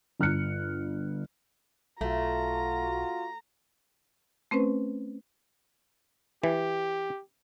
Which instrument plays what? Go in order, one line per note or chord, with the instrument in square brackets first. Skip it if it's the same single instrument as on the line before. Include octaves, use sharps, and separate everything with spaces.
[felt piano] G1 F6 F#6 C#7
[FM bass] B1 [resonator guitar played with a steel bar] A3 [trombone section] F4 F#4 [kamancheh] A#5
[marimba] A3 C4 C#4 B4 C5
[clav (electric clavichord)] E3 [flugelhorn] G4